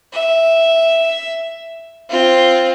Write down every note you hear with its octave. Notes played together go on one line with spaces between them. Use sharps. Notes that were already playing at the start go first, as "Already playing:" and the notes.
E5
C4 F4